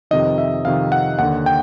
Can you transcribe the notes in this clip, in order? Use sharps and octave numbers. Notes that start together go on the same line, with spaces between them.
F2 C3 D#3 D#5
E5
F2 C3 D#3 F5
F#5
D#2 D3 F#5
G5